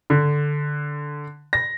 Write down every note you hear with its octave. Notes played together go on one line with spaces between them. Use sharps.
D3
A#6